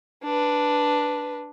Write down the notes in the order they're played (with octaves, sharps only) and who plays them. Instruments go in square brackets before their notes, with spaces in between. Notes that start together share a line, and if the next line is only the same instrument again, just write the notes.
[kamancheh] D4 B4